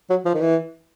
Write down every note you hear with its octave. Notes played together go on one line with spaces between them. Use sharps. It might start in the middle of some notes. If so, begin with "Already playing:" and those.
F#3
F3
D#3
E3